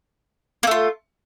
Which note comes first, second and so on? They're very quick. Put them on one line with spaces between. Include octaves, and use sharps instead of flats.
A#3 A3 F4